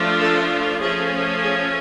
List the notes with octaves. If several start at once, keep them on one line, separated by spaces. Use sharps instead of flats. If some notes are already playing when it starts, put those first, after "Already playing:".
Already playing: F3 A3 D4 F4
A4
F3 A3 C#4 G#4
G#4